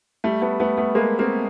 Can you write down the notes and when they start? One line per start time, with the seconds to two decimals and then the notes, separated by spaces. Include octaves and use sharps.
0.24 G3 A3
0.42 A3 B3
0.60 A3 B3
0.77 A3 B3
0.95 G#3 A#3
1.19 A#3 C4